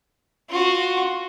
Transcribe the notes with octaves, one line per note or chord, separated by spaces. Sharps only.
F4 F#4